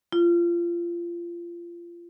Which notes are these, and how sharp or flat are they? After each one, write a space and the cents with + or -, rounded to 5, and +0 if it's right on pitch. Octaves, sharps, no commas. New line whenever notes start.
F4 -25